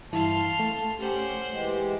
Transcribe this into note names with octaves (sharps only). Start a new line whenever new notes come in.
G2 E3 E4 F5 A5 C6
A3
C#4 G4 C5 F#5
E3 G#3 G4